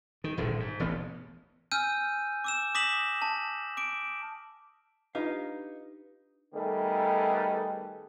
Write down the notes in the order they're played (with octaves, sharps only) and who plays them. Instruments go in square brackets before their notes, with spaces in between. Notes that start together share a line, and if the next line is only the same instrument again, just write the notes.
[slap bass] D#3
D#1 A#1 A2 D3
G#2
E1 A1 D2 B3
[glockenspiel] G#5 E6 F6 G6 D#7
D6 E6 E7
D6 D#6 A#6 B6 E7 F#7
A5
D6 D7
[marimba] D4 F4 G4 [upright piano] D#4 [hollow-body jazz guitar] B4 F5
[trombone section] D#3 G3 A3 B3 G#4 A4